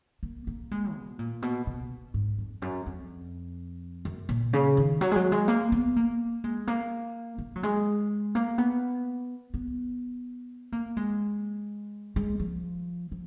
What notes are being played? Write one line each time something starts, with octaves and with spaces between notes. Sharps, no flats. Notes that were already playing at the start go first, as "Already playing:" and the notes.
A#3
A#3
G#3
B2
A#2
B2
B2
G#2
F2
F#2
F2
F#2
A#2
C#3
D#3
F#3
G#3
F#3
G#3
A#3
B3
A#3
G#3
A#3
A#3
F#3
G#3
A#3
B3
B3
A#3
G#3
G#3
F3
F3